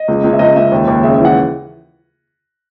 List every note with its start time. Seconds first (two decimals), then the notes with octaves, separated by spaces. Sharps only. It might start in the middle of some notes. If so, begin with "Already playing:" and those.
Already playing: D#5
0.08 C#2
0.24 C#2
0.33 E5
0.39 C#2 D#5
0.56 C#2 E5
0.72 D#2
0.87 D#2
1.03 C#3 E5
1.14 E5
1.19 E3
1.25 F#5